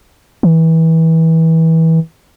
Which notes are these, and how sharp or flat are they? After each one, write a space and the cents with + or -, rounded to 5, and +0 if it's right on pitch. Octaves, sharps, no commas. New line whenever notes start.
E3 -25